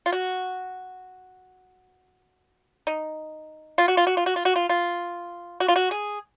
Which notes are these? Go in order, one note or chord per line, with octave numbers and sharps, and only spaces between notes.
F4
F#4
D#4
F4
F#4
F4
F#4
F4
F#4
F4
F#4
F4
F4
F#4
F4
F#4
G#4